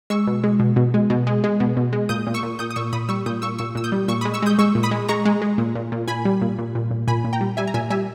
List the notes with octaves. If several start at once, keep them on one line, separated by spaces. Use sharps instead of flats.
G#3 C#6 E6
B2
G#3
B2
B2
G#3
B2
G#3
G#3
B2
B2
G#3
A#2 D#6 G6
A#2
C#6 E6
A#2
A#2 D#6 G6
D#6
A#2 C#6 E6
A#2 B5 D#6
G3 C#6 E6
A#2 D#6 G6
A#2 C#6 E6
A#2 C#6 E6
A#2 E6
D#6 G6
G3
A#2 C#6 E6
B5 D#6
G#3
C#6 E6
G#3 D#6 G6
G#3 C#6 E6
A#2
B5 D#6
G#3
G#3 A#5 C#6
G#3
G#3
A#2
A#2
A#2
A#2 G#5 B5
G3
A#2
A#2
A#2
A#2
A#2 G#5 B5
A#2
G5 A#5
G3
G3 E5 G#5
A#5
A#2 E5 G#5
G3 E5 G#5